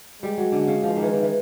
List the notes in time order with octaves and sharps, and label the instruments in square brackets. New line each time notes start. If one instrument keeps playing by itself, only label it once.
[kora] G3 [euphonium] G#3
[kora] F#3
D3
C#3
F3
D#3
E3
D#3
E3